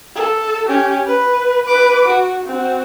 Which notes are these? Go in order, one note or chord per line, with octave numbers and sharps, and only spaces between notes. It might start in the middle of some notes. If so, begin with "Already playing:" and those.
A4
C#4 G4
B4
B4 D6
F#4
C4 F#4